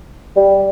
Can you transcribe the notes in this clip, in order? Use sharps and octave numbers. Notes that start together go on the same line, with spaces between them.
G3